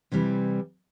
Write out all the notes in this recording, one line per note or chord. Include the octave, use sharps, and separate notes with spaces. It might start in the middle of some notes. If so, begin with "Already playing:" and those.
C3 E3 G3 C4 E4